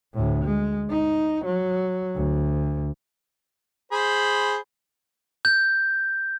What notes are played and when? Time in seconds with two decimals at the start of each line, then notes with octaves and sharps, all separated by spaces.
0.14 D2 A2
0.44 G#3
0.90 D#4
1.45 F#3
2.15 D2
3.92 G#4 C5 B5
5.45 G6